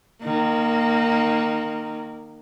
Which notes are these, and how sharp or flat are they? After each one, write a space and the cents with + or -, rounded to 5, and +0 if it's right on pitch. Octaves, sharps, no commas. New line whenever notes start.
D#3 -20 A#3 +0